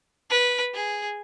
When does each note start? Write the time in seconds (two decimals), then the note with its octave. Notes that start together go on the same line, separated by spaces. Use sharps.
0.30 B4
0.74 G#4